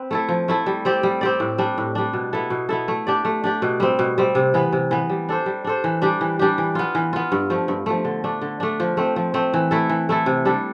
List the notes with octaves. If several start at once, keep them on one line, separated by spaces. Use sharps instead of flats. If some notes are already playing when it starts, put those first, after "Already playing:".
Already playing: C4 B4
A3 E4 A4
F3
A3 E4 A4
G3
C4 G4 D5
G3
C4 G4 D5
A2
G3 D4
A2
G3 D4
B2
B3 E4 A4
B2
B3 E4 A4
A3
D4 G4 D5
A3
D4 G4 D5
B2
G3 C4
B2
G3 C4
C3
E3 B3
C3
E3 B3
G3
D4 A4 C5
G3
D4 A4 C5
E3
G3 D4 G4
E3
G3 D4 G4
E3
B3 F4
E3
B3 F4
G2
F3 A3
G2
F3 A3
D3
A3 D4
D3
A3 D4
F3
A3 C4
F3
A3 C4
E3
A3 E4 A4
E3
A3 E4 A4
C3
G3 D4 A4